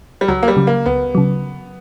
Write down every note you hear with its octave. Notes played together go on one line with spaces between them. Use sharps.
G3
C#2 F#3
A#3
G3
C#3 F#3
A#3
C#2 B3
C#3 F#3